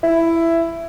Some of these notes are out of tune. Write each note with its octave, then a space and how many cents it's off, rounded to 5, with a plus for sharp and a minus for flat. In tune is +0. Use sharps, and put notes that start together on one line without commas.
E4 +10